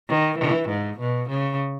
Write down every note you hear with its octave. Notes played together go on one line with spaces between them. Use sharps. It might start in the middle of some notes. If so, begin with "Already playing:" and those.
D#3
E3
G#2
B2
C#3